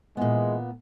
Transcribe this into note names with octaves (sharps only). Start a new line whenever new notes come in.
A#2 E3 G#3 B3